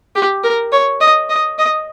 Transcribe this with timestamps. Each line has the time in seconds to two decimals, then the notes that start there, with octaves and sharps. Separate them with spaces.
0.16 G4
0.44 A#4
0.72 C#5
1.01 D#5
1.29 D#5
1.59 D#5